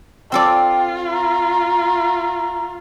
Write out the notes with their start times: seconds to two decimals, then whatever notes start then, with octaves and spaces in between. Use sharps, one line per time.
0.32 C4 F4 A4 D5 G5
1.12 A#5